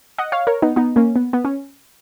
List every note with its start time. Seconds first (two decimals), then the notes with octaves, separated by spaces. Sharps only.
0.18 D#5 F#5
0.32 C#5 F5
0.47 A#4 C#5
0.62 B3 D#4
0.76 B3 D#4
0.96 A#3 C#4
1.16 B3
1.33 B3
1.45 C#4